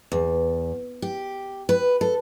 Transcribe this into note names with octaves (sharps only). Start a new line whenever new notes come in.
E2
G4
B4
A4